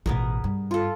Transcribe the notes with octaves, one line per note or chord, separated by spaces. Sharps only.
A1 B2 B3 G#4 A#4
G2
F4 A4